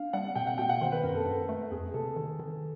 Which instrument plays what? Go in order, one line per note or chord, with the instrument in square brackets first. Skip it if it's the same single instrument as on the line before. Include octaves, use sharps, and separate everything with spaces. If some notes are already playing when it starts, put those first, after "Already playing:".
Already playing: [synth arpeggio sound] D4 [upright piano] F5
[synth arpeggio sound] G3 [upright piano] F#5
[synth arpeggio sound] B2 [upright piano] G5
[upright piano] F#5
[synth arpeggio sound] B2 [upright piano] G5
[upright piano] F#5
[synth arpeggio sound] D#3 [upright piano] C5
[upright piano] B4
[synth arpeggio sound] F#2 [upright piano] A#4
[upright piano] A4
[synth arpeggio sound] F#2
A3
[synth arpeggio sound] F2 [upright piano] G#4
[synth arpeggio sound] C3 [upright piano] A4
[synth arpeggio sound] D#3
D#3